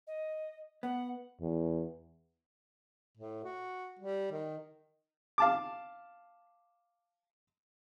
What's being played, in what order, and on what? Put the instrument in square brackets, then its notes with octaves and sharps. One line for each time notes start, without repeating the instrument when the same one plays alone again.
[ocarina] D#5
[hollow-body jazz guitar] B3 [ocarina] F#5
[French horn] E2
[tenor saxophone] A2
F#4
G3
D#3
[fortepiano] F5 A5 D6